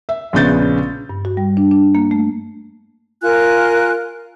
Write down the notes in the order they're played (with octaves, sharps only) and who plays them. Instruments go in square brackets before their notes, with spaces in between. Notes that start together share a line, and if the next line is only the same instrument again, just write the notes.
[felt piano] E5
A#1 C#3 B3 G6 A6
[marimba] G2
F#4
G3
D4
D4
A#3
A3
[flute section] F4 A#4 G#5 F#6